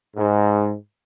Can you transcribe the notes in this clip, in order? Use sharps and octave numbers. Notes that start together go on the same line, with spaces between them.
G#2